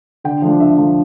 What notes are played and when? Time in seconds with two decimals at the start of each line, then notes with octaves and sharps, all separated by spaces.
0.24 D3 G5
0.42 F3 A3 D4
0.59 D3 E5
0.77 F3 A3 D4